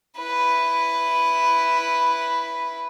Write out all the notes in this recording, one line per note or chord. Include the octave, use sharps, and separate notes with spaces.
E4 B4